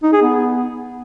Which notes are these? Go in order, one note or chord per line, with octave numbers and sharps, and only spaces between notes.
D#4
G#4
B3